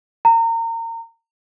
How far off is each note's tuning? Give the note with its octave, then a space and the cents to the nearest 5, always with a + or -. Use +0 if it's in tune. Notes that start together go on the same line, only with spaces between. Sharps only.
A#5 -30